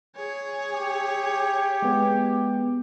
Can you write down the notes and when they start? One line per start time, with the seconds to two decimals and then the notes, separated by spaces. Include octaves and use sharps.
0.16 G#4 C#5
0.72 G4
1.82 G#3 B3